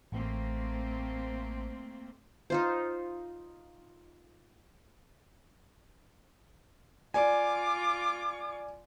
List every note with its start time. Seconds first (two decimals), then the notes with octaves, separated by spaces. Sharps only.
0.12 A1 A3 A#3 C4
2.50 D#4 F4 C5
7.14 F4 D5 G#5 D6